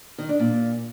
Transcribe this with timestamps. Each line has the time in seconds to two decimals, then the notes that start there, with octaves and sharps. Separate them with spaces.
0.18 D#3
0.29 D4
0.40 A#2